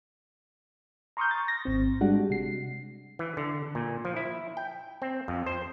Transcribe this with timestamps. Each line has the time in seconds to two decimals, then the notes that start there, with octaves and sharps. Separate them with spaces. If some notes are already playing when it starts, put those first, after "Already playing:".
1.17 A#5 C6 C#6 D#6 F6 G6
1.31 A6
1.48 A#6
1.65 G#1 C4
2.01 G3 G#3 D4 F#4 F#5
2.30 C3 C7
3.19 E3
3.37 D3
3.75 A#2
4.05 F3
4.16 E4
4.57 G5
5.02 C4
5.28 F2
5.47 C5